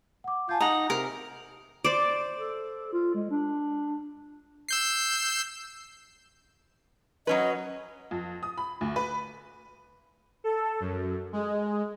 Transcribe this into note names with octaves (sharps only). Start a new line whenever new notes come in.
F#5 D6
F4 G#5 A5 G6
D#4 F#5 A#5 D#6
C3 A#4
C5 D5
A4
F4
G#3
D4
E6 G6 C7
F#3 C#4 B4 D#5
F2
D#6
B5
D2
B4
A4
F#2
G#3